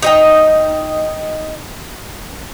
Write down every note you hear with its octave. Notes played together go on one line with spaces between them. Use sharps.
D#4 D#5 G5